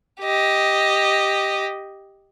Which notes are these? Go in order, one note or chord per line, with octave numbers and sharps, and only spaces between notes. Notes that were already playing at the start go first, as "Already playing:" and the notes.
G4 D#5